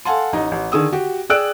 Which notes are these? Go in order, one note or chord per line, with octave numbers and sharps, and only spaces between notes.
A4 F5 F#5 G#5 A5 C6
A1 D#4 D#5
A1
D3 D#3 G#4 D#6 E6
F#4 G4
G#4 D5 G5 E6 F#6 D7